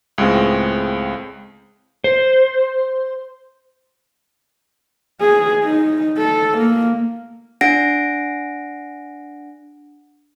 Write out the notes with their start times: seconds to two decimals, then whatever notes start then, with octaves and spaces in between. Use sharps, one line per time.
0.18 C#2 A2 G#3 C4
2.04 C5
5.21 G#4
5.64 D#4
6.17 A4
6.58 A#3
7.61 D4 F#5 A#6 D7